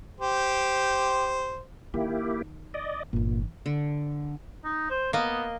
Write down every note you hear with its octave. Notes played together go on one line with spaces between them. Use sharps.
G4 C5
D#3 A#3 E4 G4
D5 D#5
G1 A#2 E3
D3
D#4
C5
A#3 B3 D#5